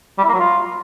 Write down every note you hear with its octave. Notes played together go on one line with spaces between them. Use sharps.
G3
E4
A#3
F#3
F4